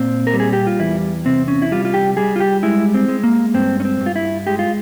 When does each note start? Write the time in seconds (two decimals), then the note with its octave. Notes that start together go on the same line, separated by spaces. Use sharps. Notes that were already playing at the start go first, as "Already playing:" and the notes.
Already playing: A#2 C4
0.27 A#4
0.33 G3
0.40 G#4
0.53 G4
0.67 F4
0.80 E2 E4
1.26 C3 C4
1.48 C#4
1.62 E4
1.72 G3 F4
1.85 F4
1.94 G4
2.17 G3 G#4
2.36 F4
2.40 G4
2.63 G#3 E4
2.94 C4
3.08 G#3
3.24 A#3
3.54 G2 C4
3.80 C#4
3.85 C4
4.01 G2
4.06 F4
4.16 E4
4.47 G#3 G4
4.59 F4